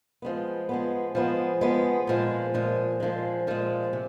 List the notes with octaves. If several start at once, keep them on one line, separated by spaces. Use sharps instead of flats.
F3 G#3 B3
F3 G#3 B3
F3 G#3 B3
F3 G#3 B3
A#2 F3 G#3
A#2 F3 G#3
A#2 F3 G#3
A#2 F3 G#3
C3